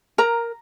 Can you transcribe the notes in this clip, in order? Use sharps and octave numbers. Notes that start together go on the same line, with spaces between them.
A#4 A#5